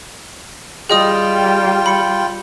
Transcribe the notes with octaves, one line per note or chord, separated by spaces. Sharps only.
G3 F4 G#4 D#5 G5 D#6
B5 C#7